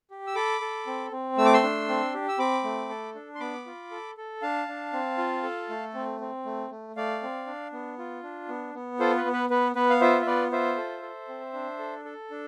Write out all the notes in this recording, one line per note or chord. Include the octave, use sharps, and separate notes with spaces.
G4
E6
A4 B5 D6
A4
C4
C4
A3 E6
D6
C6 E6
D4
C4
G4
E6
C4 B5 D6
A3
A4
D4
C6
B3 B5 D6
F4
A4
A4
D4 F5 A5
D4
C4
F4
A4
A3
C4
C4
A3
A3
A3 D5 F5
C4
D4
B3
F4
D4
B3
B3
F4 A4 C5
B4
B3
B4
B3 B4
B3 B4
F5
F4 C5 E5
E5
B3 B4 D5
F4 C5 E5
A4
A4
C4
D4
A4
A4
D4